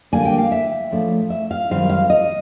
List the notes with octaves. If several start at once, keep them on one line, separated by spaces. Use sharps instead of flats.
D3 G3 A#3 D4 G#5
G5
F5
E5
A2 F3 A3 D4
E5
F5
F#2 D#3 G3 C4 D#4 F5
F5
D#5